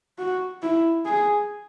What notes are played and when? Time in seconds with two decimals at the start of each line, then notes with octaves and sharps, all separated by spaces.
0.19 F#4
0.62 E4
1.06 G#4